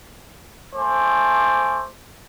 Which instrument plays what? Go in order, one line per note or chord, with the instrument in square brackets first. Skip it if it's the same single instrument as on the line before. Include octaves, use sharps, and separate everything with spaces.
[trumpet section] A3 C5 G#5 D6